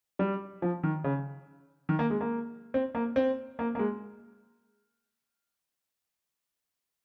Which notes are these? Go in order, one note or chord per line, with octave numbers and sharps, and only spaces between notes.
G3
F3
D#3
C#3
D#3
A#3
G#3
A#3
C4
A#3
C4
A#3
A#3
G#3